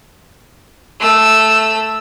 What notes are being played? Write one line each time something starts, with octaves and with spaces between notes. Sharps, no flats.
A3 E6